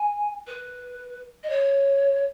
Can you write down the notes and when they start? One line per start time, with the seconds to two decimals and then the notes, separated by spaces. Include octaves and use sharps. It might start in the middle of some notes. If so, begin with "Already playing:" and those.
Already playing: G#5
0.47 B4
1.43 D#5
1.49 C#5